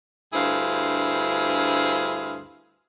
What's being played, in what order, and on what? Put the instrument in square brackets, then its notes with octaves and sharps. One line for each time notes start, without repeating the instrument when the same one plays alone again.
[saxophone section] D2 G2 E4 G#4 C5 F5